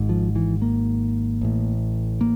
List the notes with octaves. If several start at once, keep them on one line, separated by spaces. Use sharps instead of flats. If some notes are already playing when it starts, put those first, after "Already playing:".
Already playing: G#1 G#2
F3
E3
A#3
A1 A2
A#3